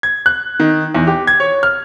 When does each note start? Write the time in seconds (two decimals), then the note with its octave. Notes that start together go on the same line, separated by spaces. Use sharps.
0.03 G#6
0.26 F#6
0.60 D#3
0.95 E2
1.07 G4
1.27 G#6
1.40 C#5
1.63 F6